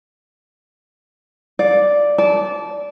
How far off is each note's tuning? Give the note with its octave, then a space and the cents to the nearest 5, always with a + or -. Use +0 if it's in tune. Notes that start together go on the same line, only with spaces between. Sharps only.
D5 +0 F5 +35
D5 -15 A5 -20